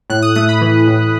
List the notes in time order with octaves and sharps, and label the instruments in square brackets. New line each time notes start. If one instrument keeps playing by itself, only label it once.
[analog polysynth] A2 F#6
D#6
A3 D#6
B5
E3
A2